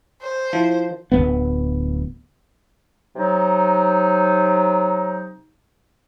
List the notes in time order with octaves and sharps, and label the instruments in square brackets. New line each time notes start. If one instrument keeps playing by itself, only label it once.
[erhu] C5
[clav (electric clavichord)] F3 [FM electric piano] E4
[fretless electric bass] D1 F#2 B3
[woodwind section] C3 F#3 D#4